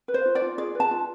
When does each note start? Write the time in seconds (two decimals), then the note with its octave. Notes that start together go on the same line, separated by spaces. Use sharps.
0.08 B4
0.14 C5
0.25 F4
0.35 D5
0.42 F4
0.58 G#4 D5
0.75 B4 A5
0.91 F4